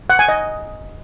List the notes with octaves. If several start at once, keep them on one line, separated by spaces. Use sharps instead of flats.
F#5
G#5
D#5